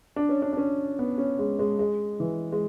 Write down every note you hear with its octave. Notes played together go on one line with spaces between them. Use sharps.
D4
C#4
D4
D4
C#4
B3
C#4
G#3
G#3
G#3
E3
G#3